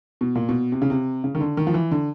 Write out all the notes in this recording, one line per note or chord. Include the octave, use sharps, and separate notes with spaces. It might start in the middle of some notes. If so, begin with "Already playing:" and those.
B2
A#2
B2
C3
C#3
C3
C#3
D#3
D3
D#3
F3
E3
D3